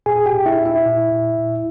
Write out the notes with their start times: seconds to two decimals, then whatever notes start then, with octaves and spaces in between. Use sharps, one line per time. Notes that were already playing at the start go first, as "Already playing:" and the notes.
0.06 A#2 G#4 G#5
0.26 G4 G5
0.33 A#2
0.46 E4 E5
0.58 A#2
0.66 E4 E5
0.86 A#2
1.12 A#2
1.38 A#2